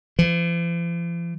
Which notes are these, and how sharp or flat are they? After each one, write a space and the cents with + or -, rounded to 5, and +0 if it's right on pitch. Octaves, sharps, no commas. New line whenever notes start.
F3 -45